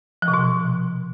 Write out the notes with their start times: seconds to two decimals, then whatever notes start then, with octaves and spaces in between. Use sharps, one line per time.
0.22 F3
0.28 C3
0.34 B2